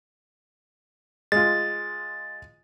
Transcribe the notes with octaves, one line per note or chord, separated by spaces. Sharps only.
G#3 F4 A6